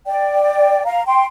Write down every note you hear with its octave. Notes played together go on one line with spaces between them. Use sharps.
D5 G5
F5 A#5
G5 C6